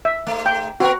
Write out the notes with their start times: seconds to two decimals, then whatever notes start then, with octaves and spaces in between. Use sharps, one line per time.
0.05 E5
0.27 G#2 A3
0.46 G5
0.80 B3 F#4 A#4